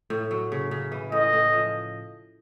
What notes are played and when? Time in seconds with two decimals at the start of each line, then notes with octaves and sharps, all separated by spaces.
0.10 A2
0.31 F#3
0.52 C#3
0.71 C#3
0.92 E3
1.12 A2 D#5
1.33 A2
1.53 F3